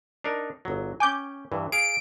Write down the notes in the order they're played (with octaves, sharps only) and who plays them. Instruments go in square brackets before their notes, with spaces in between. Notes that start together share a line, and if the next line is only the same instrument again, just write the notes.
[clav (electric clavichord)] D4 D#4 A#4
G1 F#3
[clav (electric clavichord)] C#4 G5 [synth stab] G#5 D6 G6
[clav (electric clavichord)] G2 E3
[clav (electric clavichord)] G#4 F5 [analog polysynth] D7